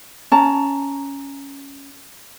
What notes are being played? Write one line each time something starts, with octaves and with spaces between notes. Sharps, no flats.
C#4 A5 A#5